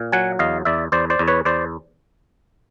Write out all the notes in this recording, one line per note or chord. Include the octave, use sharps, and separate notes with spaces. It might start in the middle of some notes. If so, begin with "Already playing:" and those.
Already playing: A#2
F#3 F#5 G#5
E2 D#5 F5
E2 D5 E5
E2 C5 D5
C5 D5
E2
B4 C#5
E2 C5 D5